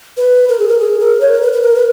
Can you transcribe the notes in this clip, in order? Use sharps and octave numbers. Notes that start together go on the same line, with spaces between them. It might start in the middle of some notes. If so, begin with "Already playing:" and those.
B4
A#4
G#4
A#4
G#4
A#4
C#5
A#4
B4
B4
A#4
B4